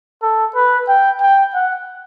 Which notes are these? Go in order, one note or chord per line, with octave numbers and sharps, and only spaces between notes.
A4
B4
G5
G5
F#5